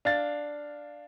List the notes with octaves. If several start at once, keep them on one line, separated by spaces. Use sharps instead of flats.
D4 F5 A6